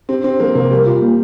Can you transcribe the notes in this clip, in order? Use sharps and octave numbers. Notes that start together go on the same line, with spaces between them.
C4 G4
C4 D4
F3 A#3
C3 A#3
G3 A#4
F4
A#3